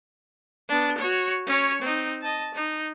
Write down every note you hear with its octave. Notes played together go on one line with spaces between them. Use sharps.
B3 D4
F#4 C#5
C#4 C#5
C4 D#4
D#5 A5
D#4